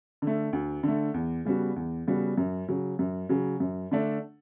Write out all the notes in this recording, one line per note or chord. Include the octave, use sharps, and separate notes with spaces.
D3 A3
D2
D3 A3
E2
C#3 G3 B3 F#4
E2
C#3 G3 B3 F#4
F#2
C#3 F#3
F#2
C#3 F#3
F#2
D3 A3 D4